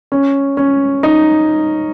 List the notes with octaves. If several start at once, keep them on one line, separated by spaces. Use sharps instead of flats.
C#4
C#4
D#4